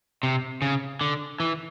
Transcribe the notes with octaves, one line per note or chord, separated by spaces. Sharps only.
C3
C#3
D3
E3